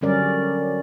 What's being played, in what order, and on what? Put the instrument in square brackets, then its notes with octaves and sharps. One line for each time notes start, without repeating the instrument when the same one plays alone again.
[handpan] D3 F#3 G3 C#4 A#4 D5